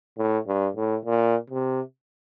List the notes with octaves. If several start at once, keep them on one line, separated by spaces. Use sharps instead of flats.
A2
G2
A2
A#2
C3